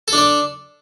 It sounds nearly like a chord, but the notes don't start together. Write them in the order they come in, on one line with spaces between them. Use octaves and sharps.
A4 D4 D5